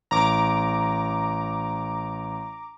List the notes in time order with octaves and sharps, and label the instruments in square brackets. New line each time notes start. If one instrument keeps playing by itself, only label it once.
[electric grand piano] A1 [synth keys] A#5 D6